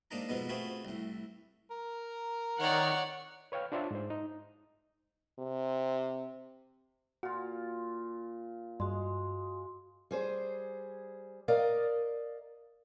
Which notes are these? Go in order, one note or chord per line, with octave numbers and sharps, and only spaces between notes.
G#2 A#3 D4 D#4 A#5
F2 G#2 B2 G#3 B3
A3 C4 F4 F#4 G#4 B4
C2 A2
A#4
D#3 C#5 D5 F#5
B4 C#5 F5 G5 F6
D4 F4 C5 C#5 E5 A5
G#2 C5
D#4
C3
A#2 F4 F#4
G2 G#3 F#4 G#4 C6
G3 G#4 C5
A#4 D5 D#5 F5